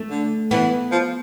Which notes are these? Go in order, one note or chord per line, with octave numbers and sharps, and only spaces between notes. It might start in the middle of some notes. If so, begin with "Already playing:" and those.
Already playing: A3
D3
E3 B3
F3